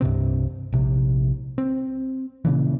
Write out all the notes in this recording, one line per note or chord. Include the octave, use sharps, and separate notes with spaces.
C2 G2 C3 C4
A#1 C3
C4
A#2 C#3 E3